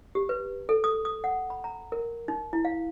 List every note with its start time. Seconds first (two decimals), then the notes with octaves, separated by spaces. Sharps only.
0.15 G4
0.29 B4
0.69 A4
0.84 D#6
1.05 D#6
1.24 F#5
1.50 B5
1.64 A#5
1.92 A#4
2.28 D#4
2.53 E4
2.65 F5